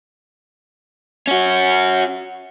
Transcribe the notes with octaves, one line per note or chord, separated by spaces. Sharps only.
C#4 F#4